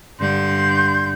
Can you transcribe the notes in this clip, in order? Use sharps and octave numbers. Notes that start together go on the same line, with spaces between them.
G2 D3 C6 G6